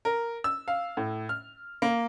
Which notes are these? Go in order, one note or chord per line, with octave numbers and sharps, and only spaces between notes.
A#4
E6
F5
A2
F6
A#3